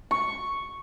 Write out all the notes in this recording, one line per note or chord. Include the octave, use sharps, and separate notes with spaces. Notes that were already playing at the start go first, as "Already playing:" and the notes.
C#6